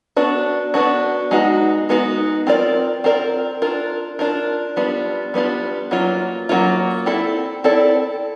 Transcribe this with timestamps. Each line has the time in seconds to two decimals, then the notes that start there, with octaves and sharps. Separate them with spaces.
0.16 B3 D4 F#4
0.74 B3 D4 F#4
1.31 G#3 B3 D#4 F#4
1.89 G#3 B3 D#4 F#4
2.47 C4 F4 A#4 D5
3.04 C4 F4 A#4 D5
3.62 D4 F4 A#4
4.19 D4 F4 A#4
4.76 G3 B3 D4 F4
5.34 G3 B3 D4 F4
5.91 F#3 A#3 C#4 F4
6.49 F#3 A#3 C#4 F4
7.06 C4 E4 A4 D5
7.64 C4 E4 A4 D5